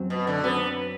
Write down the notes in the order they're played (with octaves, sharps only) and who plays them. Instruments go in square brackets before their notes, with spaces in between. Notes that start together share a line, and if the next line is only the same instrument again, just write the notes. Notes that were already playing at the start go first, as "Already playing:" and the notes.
Already playing: [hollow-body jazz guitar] F#2 F#3 C4
[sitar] B2
D3
[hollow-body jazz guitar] F#2 F#3 C4 [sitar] B3